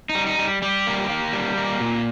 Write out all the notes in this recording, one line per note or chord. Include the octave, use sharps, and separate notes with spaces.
D#4
G3
D#4
G3
G3 G4
A#3
A#3
G3
A#3
A#2